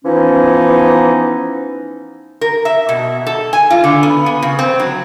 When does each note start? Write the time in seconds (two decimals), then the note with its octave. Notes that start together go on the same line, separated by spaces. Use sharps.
0.05 E3 F3 B3 C#4 D#4
2.41 A#4
2.65 E5
2.89 B2
3.27 A4
3.53 G#5
3.70 F4
3.84 D3
4.03 B3
4.26 B3
4.42 C#3
4.59 C4
4.80 F#3